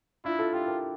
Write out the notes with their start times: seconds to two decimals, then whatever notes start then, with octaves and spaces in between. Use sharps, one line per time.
0.25 D4 E4 F4
0.39 F4 A4
0.53 E4 F4 G4
0.67 G4 A#4